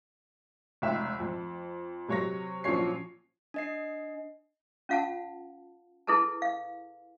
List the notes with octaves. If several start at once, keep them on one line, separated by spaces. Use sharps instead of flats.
F1 C#2 E5
F2
C3 F#3 C#5 C#6 A#6
A#1 F3 F#3 C#4 C#5 C7
D4 D#5 C7
C#4 F4 F5 F#5 A5
E4 G#4 A4 B4 A5
F5